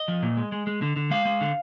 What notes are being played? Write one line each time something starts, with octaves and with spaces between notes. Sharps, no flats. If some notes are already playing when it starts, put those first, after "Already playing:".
Already playing: D#5
F3
A#2
G#3
G#3
G#3
D3
D3
G#3 F5
G#3
D3